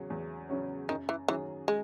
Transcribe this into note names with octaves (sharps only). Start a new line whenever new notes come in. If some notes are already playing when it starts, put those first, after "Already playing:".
Already playing: E2 C#3 F#3 C#4
E2
C#3 F#3 C#4
F#2 D#3
E3
D#3 E3 F#3 C#4 G#4
G#3